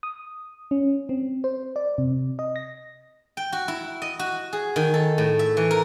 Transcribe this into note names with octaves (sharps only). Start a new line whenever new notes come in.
D#6
C#4
C4
C5
D5
C3
D#5
A#6
G5
F#4
E4
D#5
F#4
G#4
D#3
A4
A2
E5
E3
A#4